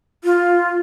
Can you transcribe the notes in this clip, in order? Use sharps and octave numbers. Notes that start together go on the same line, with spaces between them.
F4